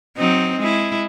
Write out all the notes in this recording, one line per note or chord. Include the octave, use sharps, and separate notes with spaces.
F#3 C4 D#4
G#3 E4